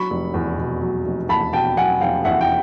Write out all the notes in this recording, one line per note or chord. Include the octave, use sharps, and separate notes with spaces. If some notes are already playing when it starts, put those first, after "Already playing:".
Already playing: F#3 B5 C#6
F1
E2
B2
F#3
F1
E2 A5 B5
B2 G5 A5
F#3 F#5 G#5
F1 F5 G5
E2 E5 F#5
G5